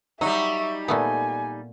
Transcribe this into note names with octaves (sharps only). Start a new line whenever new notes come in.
F#3 G3 D#4 E5 C#6
A#2 A3 B3 G#5